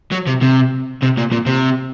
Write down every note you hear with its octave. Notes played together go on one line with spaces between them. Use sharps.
F#3
C3
C3
C3
A#2
A#2
C3